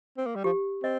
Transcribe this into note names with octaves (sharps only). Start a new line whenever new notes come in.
C4
A#3
G3
F3 G4
C4 D#5